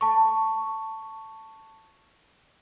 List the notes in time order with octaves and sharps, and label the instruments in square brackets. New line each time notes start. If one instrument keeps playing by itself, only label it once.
[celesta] A5 C#6